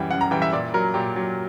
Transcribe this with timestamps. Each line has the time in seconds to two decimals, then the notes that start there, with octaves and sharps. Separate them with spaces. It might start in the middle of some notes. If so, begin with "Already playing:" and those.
Already playing: F#2 E3 G3 F#5 G5
0.11 F#2 F#5
0.21 A#5
0.31 E3 G3 G5
0.42 E5
0.52 A#2 D5
0.74 F#3 A#4
0.94 A#2 G4
1.16 F#3